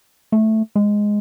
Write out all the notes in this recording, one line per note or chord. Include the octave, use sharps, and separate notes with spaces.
A3
G#3